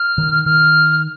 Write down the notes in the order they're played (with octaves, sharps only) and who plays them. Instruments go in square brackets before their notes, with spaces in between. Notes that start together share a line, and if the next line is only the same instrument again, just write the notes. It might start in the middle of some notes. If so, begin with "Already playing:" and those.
Already playing: [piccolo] F6
[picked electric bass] D#3
[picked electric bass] D#3 [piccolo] F6